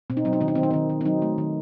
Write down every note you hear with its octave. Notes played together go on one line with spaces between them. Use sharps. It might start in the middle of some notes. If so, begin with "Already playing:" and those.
B2 C4
D#4
F#3 C4
D#4
D#3 C4
D#4
C4
D#3
D#4
D#3 C4
D#3
C4
F#3 D#4
A3
D#3